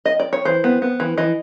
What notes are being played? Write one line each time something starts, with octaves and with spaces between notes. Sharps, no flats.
D#5
D5
C#5
E3 C5
B3
B3
E3
E3 D#5